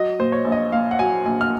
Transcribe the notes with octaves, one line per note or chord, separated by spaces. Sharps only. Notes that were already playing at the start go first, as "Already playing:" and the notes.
Already playing: F#3 D#5
A#2 C5
C#5
A#1
D#5
A#2 F5
F#5
F#3 G#5
A#1 G#5
F6